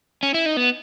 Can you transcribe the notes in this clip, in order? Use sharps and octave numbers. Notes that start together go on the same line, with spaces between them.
C#4
E4
D#4
B3